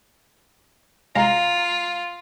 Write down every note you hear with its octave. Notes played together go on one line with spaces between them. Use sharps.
C2 G#3 F4 F5 A#5